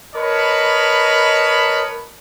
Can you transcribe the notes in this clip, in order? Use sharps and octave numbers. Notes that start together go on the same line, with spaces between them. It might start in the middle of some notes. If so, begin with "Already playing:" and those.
A#4 B4 C#5 D#5 A5 B5